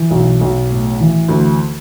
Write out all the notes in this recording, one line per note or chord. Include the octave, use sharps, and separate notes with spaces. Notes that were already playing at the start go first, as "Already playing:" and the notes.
Already playing: E3
B1
B1
A2
E3
D2